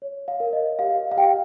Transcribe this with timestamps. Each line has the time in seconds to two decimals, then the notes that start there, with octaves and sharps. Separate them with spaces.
0.02 C#5
0.28 F5
0.40 A#4
0.53 D#5
0.79 G4 F5
1.11 F5
1.17 G4 G5